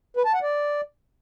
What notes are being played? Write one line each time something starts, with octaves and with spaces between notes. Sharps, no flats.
B4
A5
F#5
D5